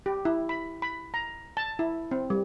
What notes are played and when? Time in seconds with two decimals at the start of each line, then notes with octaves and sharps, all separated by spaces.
0.06 G4
0.25 E4
0.49 B5
0.82 B5
1.14 A#5
1.57 A5
1.79 E4
2.11 C4
2.30 G3